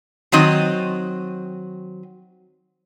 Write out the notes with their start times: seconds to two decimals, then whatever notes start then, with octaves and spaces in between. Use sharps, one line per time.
0.32 D#3 F#3 C4 D#5